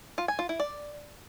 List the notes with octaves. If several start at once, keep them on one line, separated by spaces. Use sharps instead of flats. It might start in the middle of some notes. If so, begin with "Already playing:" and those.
F4
G#5
F4
E4
D5